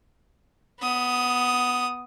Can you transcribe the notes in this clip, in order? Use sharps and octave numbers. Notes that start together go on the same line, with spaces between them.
B3 D#6